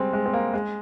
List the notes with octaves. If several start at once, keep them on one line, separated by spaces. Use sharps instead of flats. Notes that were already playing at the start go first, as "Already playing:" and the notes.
Already playing: G3 G#3 C4
G#3
C4
A#3
G#3